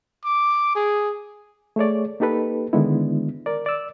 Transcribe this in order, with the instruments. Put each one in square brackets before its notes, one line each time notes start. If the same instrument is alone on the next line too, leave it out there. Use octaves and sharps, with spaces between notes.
[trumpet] D6
G#4
[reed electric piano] A3 G#4 C#5 D5
A#3 D#4 G4 A4 B4
D3 D#3 G#3 B3 D4 E4
A#4 D5
D5 E6